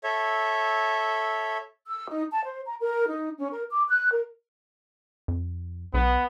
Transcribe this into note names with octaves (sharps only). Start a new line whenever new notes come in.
A4 C#5 E5
E6
D#4
A5
C5
A#5
A#4
D#4
C#4
A#4
D6
F#6
A#4
F2
B1 B3